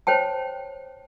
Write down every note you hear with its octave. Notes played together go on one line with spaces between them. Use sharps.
C5 C#5 G5 A5